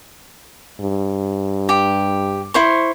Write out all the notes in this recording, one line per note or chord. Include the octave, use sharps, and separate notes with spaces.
G2
G4
E4 C5 C#6